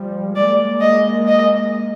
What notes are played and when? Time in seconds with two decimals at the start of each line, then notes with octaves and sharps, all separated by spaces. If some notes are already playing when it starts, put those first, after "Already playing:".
Already playing: F3 G3
0.36 G#3 A#3 D5
0.82 D#5
1.28 D#5